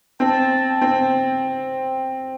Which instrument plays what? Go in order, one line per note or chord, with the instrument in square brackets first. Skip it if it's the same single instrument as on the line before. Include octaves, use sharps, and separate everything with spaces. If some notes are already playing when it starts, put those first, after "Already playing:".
[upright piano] C4 [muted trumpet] A5
[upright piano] C4